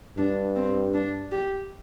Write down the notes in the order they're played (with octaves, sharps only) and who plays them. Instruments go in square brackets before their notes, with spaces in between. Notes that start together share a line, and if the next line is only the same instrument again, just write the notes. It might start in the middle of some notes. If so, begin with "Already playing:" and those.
[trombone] G2 [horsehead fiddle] D4
[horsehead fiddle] C4
D4
G4